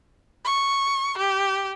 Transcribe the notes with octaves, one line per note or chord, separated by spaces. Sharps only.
C#6
G4